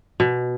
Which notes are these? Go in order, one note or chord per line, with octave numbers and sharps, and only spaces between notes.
B2